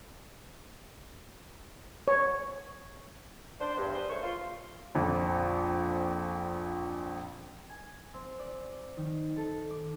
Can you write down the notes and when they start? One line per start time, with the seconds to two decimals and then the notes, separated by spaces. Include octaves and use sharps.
2.08 C#5
3.60 D4 C5
3.77 E2 G2
3.93 G3 G#4 B4 C5
4.09 D#3 A3 C5 C#5 C#6
4.23 F4 C6
4.95 A#1 F2
7.69 G#5
8.14 C4
8.39 D5
8.97 D#3
9.37 A4
9.70 D6